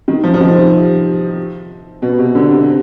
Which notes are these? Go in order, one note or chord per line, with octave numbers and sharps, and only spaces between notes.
D#3
F3
F3
D#3
C3
B2
C3
D3
C3
C3